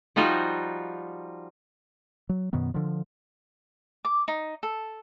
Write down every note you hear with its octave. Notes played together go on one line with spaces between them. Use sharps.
F3 G3 D#4 F4 F#4
F#3
F#2 B2 D#3 B3
D3 F3
D6
D#4
A4